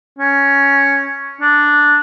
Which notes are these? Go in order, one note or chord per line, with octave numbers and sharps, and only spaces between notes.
C#4
D4